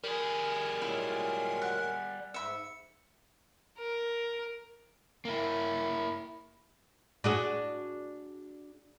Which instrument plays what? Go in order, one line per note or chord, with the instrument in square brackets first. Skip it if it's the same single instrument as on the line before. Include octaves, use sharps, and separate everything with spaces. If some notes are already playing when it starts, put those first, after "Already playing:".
[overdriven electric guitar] G3 G#4 [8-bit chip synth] A#4
[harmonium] A#2 F#3 G#3 [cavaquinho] E4
[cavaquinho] F#5
[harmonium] G#2 [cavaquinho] E5 B5 [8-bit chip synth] C#7
[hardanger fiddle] A#4
[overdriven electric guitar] A#3 E4
[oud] D4 F#4 G#4